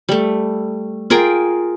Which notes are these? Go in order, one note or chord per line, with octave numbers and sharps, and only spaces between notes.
G3 A3
F4 G#4 A#4 G5